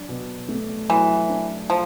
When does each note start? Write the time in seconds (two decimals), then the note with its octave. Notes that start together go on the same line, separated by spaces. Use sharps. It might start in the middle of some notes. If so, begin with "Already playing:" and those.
Already playing: F#3 D4
0.09 B2
0.48 A3
0.89 E3 F#3
1.30 D4
1.70 F3